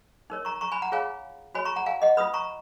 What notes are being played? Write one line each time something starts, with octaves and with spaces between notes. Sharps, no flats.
D#4 A#4 C#5
A#5 C#6
A#5 C#6
G#5 B5
F#5 A#5
F4 G#4 C#5 F5 G#5
F#4 C#5 G#5 B5
A#5 C#6
F#5 A#5
F5 G#5
D#5 F#5
F4 B4 B5 D#6
A#5 C#6